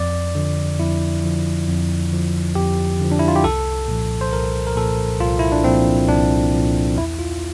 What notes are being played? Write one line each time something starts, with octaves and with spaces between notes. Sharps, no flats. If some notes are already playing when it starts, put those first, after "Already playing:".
Already playing: F2 D5
D3 F3
F2 E4
D3 F3
F2
D3 F3
F2 G4
D3 F3
D4
E4
F4
G4
C2 A4
A#2 F3
C5
C2 A#4
A#4
A#2 F3 A4
C2 F4
E4
D4
A#2 F3 C4
C2 D4
A#2 F3
E2 E4
F4